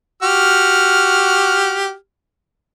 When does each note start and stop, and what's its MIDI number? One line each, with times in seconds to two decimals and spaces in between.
0.23 1.94 66
0.23 1.94 67
0.23 1.94 89